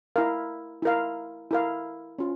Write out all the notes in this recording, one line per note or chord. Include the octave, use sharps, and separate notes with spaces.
E4 A#4 F5
E4 A#4 F5
E4 A#4 F5
C#4 F4